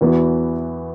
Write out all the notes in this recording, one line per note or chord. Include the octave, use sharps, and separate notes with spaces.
E2 E3 B3 F#4